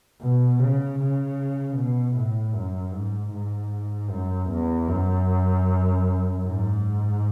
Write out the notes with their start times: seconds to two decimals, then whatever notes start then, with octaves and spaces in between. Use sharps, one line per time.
0.22 B2
0.60 C#3
0.99 C#3
1.77 B2
2.16 A2
2.55 F#2
2.94 G#2
3.33 G#2
4.11 F#2
4.50 E2
4.89 F#2
6.45 G#2